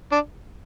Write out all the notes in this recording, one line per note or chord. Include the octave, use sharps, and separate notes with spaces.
D4